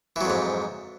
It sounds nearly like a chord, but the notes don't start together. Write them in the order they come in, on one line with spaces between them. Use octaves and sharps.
E3 F#3 F2 G#2